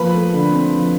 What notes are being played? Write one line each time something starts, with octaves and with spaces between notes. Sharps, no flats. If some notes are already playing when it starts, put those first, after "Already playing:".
Already playing: F3 A#3 B4 B5
A3
D3
C4
F3